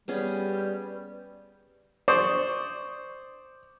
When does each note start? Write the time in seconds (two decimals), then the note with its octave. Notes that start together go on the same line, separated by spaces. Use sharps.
0.08 G3 B3 C#4 G#4
2.08 C5 D5 C#6 D#6